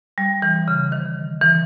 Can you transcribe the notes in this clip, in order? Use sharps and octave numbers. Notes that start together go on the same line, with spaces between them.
G3
E3
C#3
D#3
E3